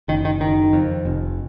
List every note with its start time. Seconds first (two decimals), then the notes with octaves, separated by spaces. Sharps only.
0.08 F#1 D#3
0.25 D#3
0.41 F#1 D#3
0.73 F2
1.05 F1